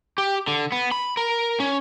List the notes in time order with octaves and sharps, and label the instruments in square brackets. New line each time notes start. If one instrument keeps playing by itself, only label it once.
[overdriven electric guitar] G4
D3
B3
B5
A#4
C#4